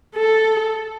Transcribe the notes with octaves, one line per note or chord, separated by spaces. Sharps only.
A4